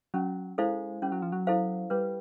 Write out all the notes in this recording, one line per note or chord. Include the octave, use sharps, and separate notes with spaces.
F#3 C#4
G#3 E4 A4 C5 F5
G3 C#4
F#3
F3
F#3
E4 A4 C5 F5
G3 B4